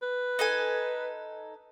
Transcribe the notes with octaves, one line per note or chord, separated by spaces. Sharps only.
B4
D#4 A4 G#5